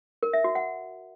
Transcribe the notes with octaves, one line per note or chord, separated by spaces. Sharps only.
A#4
E5
F#4
F#5